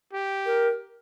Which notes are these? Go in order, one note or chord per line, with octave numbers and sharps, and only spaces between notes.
G4
A#4